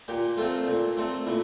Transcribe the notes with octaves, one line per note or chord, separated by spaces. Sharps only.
A#2 G4
A3 C4 F4
A#2
A3 C4
A#2 E4